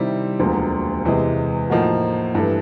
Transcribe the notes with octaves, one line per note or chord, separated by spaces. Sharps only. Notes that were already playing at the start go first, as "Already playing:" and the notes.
Already playing: C3 D#3 G3 C4 E4
E1 D2 D3 F3 A#3
E2 C3 E3 G#3
A2 F3 A#3 D#4 F#4
G2 E3 A3